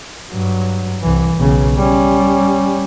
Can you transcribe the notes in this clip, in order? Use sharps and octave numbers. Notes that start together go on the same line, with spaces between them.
G2 F#3
C2 E3
B1 C#3
G3 C#4